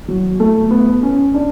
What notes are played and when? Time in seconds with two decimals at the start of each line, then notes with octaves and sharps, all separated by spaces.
0.08 F#3
0.40 A3
0.71 B3
1.03 C#4
1.34 D4